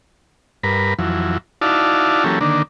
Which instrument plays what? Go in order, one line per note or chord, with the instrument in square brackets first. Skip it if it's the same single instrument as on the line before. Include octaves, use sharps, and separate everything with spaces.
[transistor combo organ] G2 A#4 B4
F2 E3 F#3
D#4 E4 F#4 D5 F5 A5
E3 F#3 A#3 C#4 G4 A4
D3 D#3 A#3 D4